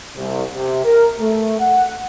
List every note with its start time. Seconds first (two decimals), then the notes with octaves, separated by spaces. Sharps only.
0.17 C2
0.54 C3
0.85 A#4
1.20 A3
1.59 F#5